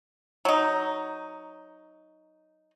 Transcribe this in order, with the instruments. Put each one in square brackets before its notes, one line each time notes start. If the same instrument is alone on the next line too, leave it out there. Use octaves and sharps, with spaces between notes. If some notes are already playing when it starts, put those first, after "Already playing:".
[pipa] F#3 D#4